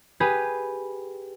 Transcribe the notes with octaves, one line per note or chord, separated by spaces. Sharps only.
G4 G#4 B4